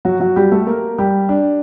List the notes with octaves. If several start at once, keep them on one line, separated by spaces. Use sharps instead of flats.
F#3 F#4
F#3 F#4
G3 G4
A3 A4
A#3 A#4
G3 G4
D4